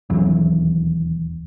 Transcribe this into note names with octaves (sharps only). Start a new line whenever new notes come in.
E1 D#2 E3 F#3